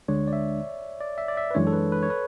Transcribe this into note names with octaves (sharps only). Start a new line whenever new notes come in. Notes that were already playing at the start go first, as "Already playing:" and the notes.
D2 D3 G#3 D4 C#5
D5
E5
D5
E5
D5
E5
B4
F#2 E3 G#3 D4 C#5
A4
B4
B4
C#5
B4